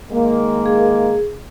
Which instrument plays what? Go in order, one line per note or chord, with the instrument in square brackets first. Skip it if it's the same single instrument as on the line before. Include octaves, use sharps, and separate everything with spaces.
[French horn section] D#3 G#3 A#3
[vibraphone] G#4